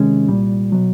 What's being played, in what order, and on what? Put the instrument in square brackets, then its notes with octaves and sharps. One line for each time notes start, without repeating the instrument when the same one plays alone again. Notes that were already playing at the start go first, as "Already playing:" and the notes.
Already playing: [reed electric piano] C3 D#3 G#3 C#4
C2 A#2 G3
B2 F#3